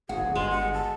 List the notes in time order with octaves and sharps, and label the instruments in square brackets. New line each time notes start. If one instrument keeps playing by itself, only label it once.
[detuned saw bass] G#1 [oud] F#4 [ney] G#4
[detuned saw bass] D1
[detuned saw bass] G1 [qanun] G#3 [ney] C6
[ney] F#5
A5